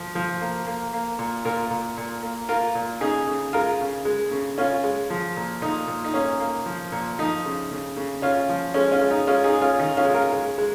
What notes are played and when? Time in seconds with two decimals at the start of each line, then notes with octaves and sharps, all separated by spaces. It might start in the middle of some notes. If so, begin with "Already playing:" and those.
Already playing: F3
0.15 F3
0.41 A#3
0.67 A#3
0.93 A#3
1.19 A#2
1.45 A#2 F4 A#4
1.70 A#2
1.97 A#2
2.23 A#3
2.49 A#3 F4 A#4
2.75 A#2
3.01 C#3 D#4 G#4
3.28 C#3
3.53 G#3 F4 A#4
3.80 C#3
4.05 G#3
4.31 C#3
4.58 C#3 C#4 F4
4.83 G#3
5.10 F3
5.36 A#2
5.62 A#2 D#4
5.88 A#2
6.04 D#4
6.14 A#3 C#4
6.40 A#3
6.66 F3
6.92 A#2
7.19 F3 D#4
7.45 C#3
7.71 C#3
7.97 C#3
8.22 C#3 C#4 F4
8.49 F3
8.74 G#3 C#4
8.92 C#4 F4
9.01 G#3
9.10 D#4
9.27 G#3 C#4 F4
9.44 D#4 G#4
9.53 G#3
9.62 C#4 F4
9.80 D#3 D#4
9.97 C#4 F4
10.05 G#3
10.14 F4 A#4
10.32 G#3
10.58 G#3